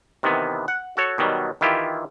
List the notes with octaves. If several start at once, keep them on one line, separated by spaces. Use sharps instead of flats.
C3 D#3 E3 B3
F#5
F#4 A4 C#5
B2 D#3 F#3 G3
D#3 E3 E4 F4 G4